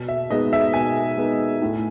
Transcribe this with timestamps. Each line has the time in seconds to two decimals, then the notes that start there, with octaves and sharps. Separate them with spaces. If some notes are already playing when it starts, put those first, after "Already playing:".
Already playing: B2
0.08 E5
0.30 G#3 B3 D#4 D#5
0.53 E5
0.74 B2 G#5
1.17 G#3 B3 D#4
1.62 A2